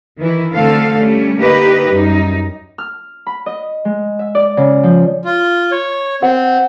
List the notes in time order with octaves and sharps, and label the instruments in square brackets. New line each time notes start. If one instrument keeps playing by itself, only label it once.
[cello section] D#3 E3 E4
D3 F#3 A3 C4 A4 F5
G3 A3 C#4
D3 A#3 D#4 G4 B4 D#5
F#2 G3 D#4
[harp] F6
B5
D#5
G#3
E5
D5
C#3
F3
[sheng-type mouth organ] F4
C#5
[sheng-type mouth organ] C4 [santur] F#5